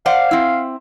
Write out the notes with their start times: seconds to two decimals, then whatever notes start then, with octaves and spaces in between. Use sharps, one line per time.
0.06 C5 D5 F5 F#5
0.31 C4 E4